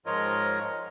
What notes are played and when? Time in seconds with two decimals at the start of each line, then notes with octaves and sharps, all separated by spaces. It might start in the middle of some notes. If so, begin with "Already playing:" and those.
0.06 G#2 F3 F4 A#4 C#5 D#5